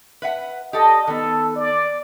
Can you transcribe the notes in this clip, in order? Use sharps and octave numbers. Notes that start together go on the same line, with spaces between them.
B4 E5 F#5
G4 A4 D5 D#5
D#3 B3 A4
D5